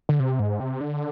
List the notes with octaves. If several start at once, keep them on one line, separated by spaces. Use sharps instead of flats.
D3
C3
G#2
C3
D3